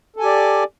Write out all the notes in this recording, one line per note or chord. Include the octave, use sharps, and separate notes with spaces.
G4 A4 D5 G#5